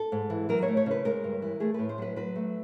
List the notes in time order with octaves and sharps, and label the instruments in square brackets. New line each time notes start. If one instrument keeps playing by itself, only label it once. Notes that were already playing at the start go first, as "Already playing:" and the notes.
Already playing: [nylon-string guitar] A4
G#2
E3
F#3 A#4
C#5
A3
C#5
C#3 B4
G#3 A#4
G2
E3
A3 G#4
A2 B4
C5
F#3 B4
F#3 B4
A3